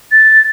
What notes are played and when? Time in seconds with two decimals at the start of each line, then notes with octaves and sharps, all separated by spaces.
0.12 A6